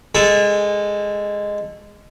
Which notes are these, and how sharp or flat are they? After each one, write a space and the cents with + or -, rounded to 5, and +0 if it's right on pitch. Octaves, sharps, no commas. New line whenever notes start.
G#3 -10 A4 +0 G#5 -35